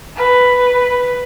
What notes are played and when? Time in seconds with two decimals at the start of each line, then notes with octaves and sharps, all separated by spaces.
0.16 B4